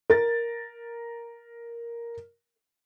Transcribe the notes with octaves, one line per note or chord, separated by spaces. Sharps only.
A#4 A6